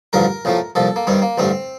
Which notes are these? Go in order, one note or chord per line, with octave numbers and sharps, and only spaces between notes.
A1 G2 D3 F3 A#4
A#1 A2 F3 A3
C2 A#2 F3 A4
A#3
G2 D#3 G3 C4
A#3
A1 G2 D3 A3 C4